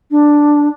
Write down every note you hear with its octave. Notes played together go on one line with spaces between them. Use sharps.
D4